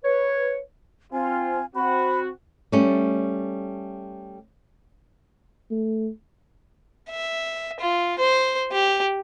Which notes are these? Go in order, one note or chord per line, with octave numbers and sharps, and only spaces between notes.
B4 C#5
C4 F4 G#5
C4 F#4 B5
G3 A3 C#4
A3
E5
F4
C5
G4